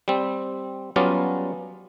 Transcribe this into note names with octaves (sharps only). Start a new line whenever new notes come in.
G3 C4
F#3 G3 B3 C#4 F4 D5